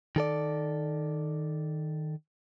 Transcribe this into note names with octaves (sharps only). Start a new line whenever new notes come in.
D#3 A4 D5